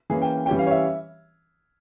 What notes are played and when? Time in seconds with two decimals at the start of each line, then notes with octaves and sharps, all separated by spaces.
0.10 E3 A#3 C#4 G#4
0.22 G5
0.46 E3 G3 C#4 G5
0.59 F5
0.67 C#5
0.71 E5